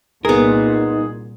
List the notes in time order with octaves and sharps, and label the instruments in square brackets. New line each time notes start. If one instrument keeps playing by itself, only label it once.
[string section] C2 A#2 [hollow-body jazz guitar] B3 A#4 [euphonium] D#4 [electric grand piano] G#4